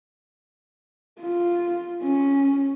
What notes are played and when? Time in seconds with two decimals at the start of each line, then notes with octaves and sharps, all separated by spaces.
1.21 F4
2.03 C#4